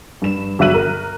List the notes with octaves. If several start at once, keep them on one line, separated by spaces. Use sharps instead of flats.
G2 E7
G1 F#3 E5 F#6 D#7 F#7
A#4